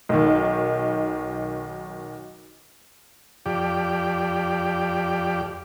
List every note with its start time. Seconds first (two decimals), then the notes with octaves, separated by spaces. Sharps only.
0.09 B1 D#3
3.46 F2 G4 D5